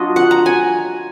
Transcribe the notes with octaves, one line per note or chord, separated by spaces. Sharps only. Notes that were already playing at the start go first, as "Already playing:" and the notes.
Already playing: F#3 D4 F4 D#5
F#5
A#5
G#5